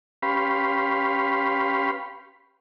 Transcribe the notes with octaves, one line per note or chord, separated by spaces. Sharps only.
C#4 G4 B4 F5 B5 C6